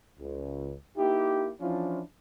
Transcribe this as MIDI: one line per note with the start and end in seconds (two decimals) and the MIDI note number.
0.19 0.74 37
0.98 1.51 58
0.98 1.51 63
0.98 1.51 64
0.98 1.51 67
1.61 2.01 52
1.61 2.01 53
1.61 2.01 61
1.61 2.01 62
1.61 2.01 64
1.61 2.01 65